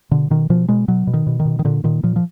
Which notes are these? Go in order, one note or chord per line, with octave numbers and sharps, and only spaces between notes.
B2 D3
B2 D#3
B2 F3
B2 G#3
B2 F#3
B2
D#3
B2
D#3
B2
D#3
A#2 D3
A#2 D#3
A#2 F3
F3